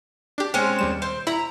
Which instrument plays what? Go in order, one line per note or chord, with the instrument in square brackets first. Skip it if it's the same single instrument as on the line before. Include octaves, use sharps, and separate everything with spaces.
[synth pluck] D4 G4
[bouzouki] G#3 C4 C#4
[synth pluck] D#2 G3 E7
[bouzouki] C4
[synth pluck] E4 [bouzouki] A#5